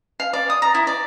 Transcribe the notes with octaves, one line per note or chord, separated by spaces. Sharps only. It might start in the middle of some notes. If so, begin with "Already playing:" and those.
F5
D5
D#6
A#5
E4
D5